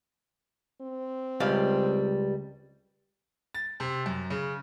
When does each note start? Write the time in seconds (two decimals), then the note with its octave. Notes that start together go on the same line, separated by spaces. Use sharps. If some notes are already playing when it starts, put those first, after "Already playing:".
0.81 C4
1.40 C#2 G3 F5
3.54 A6
3.80 C3
4.06 F#2
4.30 C#3